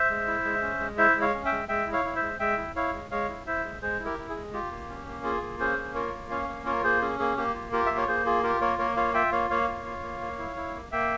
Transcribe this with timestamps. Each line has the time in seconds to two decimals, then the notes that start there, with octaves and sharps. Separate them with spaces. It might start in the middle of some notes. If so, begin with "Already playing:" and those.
Already playing: C5 E5
0.10 G#3
0.27 E4
0.44 G#3
0.62 C#4
0.80 G#3
0.98 E4 C5 E5
1.15 G#3
1.21 C#5 F5
1.34 C#4
1.45 E5 G5
1.52 G#3
1.68 G#3 E5 G5
1.86 E4
1.93 C#5 F5
2.05 E4
2.16 C5 E5
2.22 G#3
2.39 G#3 E5 G5
2.57 E4
2.76 E4 C#5 F5
2.93 G#3
3.11 G#3 C#5 F5
3.29 E4
3.46 E4 C5 E5
3.64 G#3
3.82 G#3 G#4 C5
3.99 E4
4.06 G4 A#4
4.18 E4
4.29 G#4
4.35 G#3
4.53 F4 G4
4.71 A#3
4.89 C#4
5.07 A#3
5.24 F4 G#4
5.41 A#3
5.60 C#4 G#4 C5
5.78 A#3
5.95 F4 A#4 C#5
6.13 A#3
6.30 C#4 C#5 F5
6.48 A#3
6.66 F4 A#4 C#5
6.84 A#3 G#4 C5
7.02 C#4 G#4
7.19 A#3 G#4
7.37 A#3 G4
7.54 F4
7.72 F4 G4 A#4
7.86 A#3 E5
7.97 C#5
8.08 A#3 G#4 C5
8.26 F4 G#4
8.43 F4 G4 A#4
8.61 A#3 A#4 C#5
8.78 A#3 A#4 C#5
8.97 F4 C#5 F5
9.14 F4 E5 G5
9.32 A#3 C#5 F5
9.50 A#3 C#5 F5
9.68 F4
9.86 F4
10.03 A#3
10.21 A#3
10.39 E4
10.56 E4
10.75 A#3
10.92 A#3 E5 G5